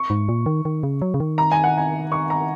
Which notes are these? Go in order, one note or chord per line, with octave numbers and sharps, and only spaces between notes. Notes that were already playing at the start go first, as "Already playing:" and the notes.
Already playing: C#6
G#2
A#2
D#3
D#3
C#3
F#3
C#3
D#3
A#5
G#5
F#5
G#5
C#6
A#5